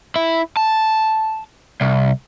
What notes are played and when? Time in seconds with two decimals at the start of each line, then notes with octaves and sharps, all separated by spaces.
0.16 E4
0.57 A5
1.81 C2